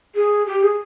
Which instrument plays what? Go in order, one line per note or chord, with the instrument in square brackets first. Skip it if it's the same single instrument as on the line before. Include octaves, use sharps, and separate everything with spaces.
[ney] G#4
G4
G#4